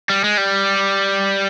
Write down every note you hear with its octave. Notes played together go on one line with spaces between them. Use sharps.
G3
G#3
G3